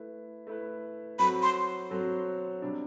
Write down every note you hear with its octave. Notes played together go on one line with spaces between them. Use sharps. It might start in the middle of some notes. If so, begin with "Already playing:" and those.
Already playing: A3 E4 B4
A3 E4 B4
F#3 C4 F#4 A4 B5
C6
F#3 C4 F#4 A4
C3 G3 D4